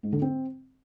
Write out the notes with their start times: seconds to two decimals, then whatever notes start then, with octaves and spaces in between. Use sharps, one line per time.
0.03 G#2
0.12 D3
0.22 C4